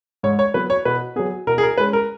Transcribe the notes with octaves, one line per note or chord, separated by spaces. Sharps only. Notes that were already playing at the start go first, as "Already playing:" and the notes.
G#2 C#5
C#5
F#3 B3 B4
C#5
B2 B4
F#3 B3 G#4
B2 A#4
G#4
A#4
G#3 C#4 B4
A#4